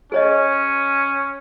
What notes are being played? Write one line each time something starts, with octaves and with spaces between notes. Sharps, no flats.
C#4 G#4 C#5 D#5